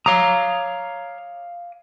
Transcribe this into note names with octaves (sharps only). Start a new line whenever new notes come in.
C#5 F5 A#5 D6 D#6